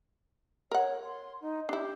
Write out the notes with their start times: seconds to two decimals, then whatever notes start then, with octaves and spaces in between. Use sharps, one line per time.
0.71 A#4 C#5 F#5
1.04 C6
1.41 D#4
1.69 D4 E4 G4